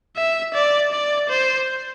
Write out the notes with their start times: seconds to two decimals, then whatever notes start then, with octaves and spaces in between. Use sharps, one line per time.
0.16 E5
0.54 D5
0.92 D5
1.30 C5